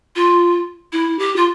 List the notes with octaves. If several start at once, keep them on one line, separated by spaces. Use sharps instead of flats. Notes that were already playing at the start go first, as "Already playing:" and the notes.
F4
E4
G4
F4